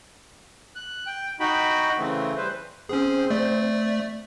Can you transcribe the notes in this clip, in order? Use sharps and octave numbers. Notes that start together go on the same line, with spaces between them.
F#6
G5
D#4 F#4 G5 B5
C#3 E3 A3 C4
G3 B4 C5
C4 C#4 G#4
A3 D5